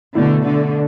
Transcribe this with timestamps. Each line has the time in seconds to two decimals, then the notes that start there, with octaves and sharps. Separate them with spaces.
0.15 B2 D3 A3 E4
0.46 D3